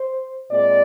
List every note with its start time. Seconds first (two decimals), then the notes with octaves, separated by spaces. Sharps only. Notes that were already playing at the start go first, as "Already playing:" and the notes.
Already playing: C5
0.50 A#2 G#3 C4 D5